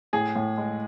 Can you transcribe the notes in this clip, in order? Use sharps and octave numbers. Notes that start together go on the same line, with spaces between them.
A2 G#4
A2
G#3